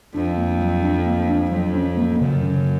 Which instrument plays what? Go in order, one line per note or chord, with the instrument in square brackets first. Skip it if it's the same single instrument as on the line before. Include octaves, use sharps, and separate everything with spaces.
[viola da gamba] F2 [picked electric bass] D4
[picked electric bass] A#3
F#3
D4
A#3
D4
[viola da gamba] F2 [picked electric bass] F#3
[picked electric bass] C#4
A#3
[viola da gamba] F#2 [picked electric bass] C#3
[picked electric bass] C#3